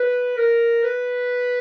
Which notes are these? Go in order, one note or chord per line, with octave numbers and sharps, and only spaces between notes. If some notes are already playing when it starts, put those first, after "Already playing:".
Already playing: B4
A#4
B4